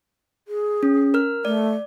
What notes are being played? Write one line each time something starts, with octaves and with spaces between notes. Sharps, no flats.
G#4
C#4
A#4 F6
A3 D5